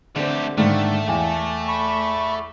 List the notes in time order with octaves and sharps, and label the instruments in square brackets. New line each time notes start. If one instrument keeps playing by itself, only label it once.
[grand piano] D3 C4 [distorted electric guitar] A3 G4
[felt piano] G#2 [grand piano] D3 D#3 A#3 [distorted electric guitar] A3
[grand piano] E2 [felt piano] F5 G5 G#5
[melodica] B5 C#6